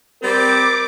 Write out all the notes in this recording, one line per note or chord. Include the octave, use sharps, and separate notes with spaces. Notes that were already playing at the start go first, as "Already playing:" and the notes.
G3 C4 A#4 D6